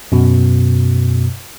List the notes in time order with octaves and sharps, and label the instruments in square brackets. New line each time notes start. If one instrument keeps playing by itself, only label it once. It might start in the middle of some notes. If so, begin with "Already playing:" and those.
[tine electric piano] F#2 B2